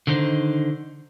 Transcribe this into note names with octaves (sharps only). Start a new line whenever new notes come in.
D3 D#3 D#4 C5